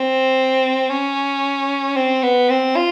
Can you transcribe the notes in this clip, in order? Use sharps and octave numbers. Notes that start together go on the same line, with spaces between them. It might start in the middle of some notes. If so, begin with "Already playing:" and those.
Already playing: C4
C#4
C4
B3
C4
F4